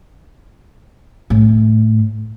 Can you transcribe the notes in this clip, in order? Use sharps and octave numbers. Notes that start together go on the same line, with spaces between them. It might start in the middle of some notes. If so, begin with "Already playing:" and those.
A2